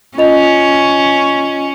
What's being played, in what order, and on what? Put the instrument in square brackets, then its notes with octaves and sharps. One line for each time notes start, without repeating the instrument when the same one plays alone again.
[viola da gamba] C#4 [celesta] F4 D#5 F7